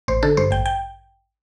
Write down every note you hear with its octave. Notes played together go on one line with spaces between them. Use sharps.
A1 C5
D3 A4
G2 C5
A1 G5
G5